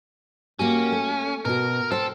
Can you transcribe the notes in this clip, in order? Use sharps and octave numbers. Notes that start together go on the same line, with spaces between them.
A#3 C#4 F#4 G4
A3
B2 F#4 A#4
A4 C5 G5